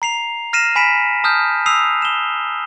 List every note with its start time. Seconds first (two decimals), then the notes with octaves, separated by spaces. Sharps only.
0.02 A#5 C7 F7
0.53 F6 A#6 C7 D#7 E7
0.76 G#5 B5 B6 D7 E7
1.24 A5 D#6 F6 G6
1.66 D#6 E6 C7 D#7 F7
2.02 E7 G7